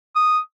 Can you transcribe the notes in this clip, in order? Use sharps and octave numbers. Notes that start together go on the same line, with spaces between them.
D#6